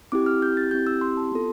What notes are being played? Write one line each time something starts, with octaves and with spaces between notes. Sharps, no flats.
C4 E4 G4 D6
F6
G6
A6
C4 E4 G4 G6
E6
C6
A5
B3 F4 A4 C6